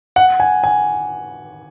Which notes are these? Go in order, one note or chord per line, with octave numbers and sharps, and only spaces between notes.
F#5
G#5
G#5